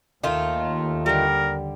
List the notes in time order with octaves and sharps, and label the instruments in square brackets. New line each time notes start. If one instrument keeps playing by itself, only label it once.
[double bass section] D#2 [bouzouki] D#3 A3 F4
[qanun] D3 G3 [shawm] A#4